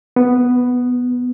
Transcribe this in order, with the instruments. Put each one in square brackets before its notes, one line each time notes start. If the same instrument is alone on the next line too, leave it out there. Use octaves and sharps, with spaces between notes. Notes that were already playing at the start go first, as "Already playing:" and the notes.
[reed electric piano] B3